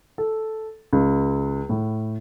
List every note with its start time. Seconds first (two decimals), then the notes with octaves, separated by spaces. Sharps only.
0.18 A4
0.93 C#2
1.69 A2